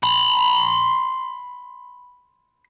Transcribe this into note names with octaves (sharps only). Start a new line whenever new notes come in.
B5 C6